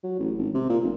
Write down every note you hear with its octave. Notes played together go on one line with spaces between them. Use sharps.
F#3
A1
G#1
C3
A#2
F1